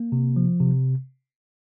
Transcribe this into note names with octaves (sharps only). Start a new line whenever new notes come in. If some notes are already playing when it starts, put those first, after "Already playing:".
Already playing: A#3
C3
F3
C3